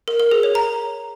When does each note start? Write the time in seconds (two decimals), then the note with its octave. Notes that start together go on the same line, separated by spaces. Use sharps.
0.08 A#4
0.20 A#4
0.31 G#4
0.43 C#5
0.55 A#5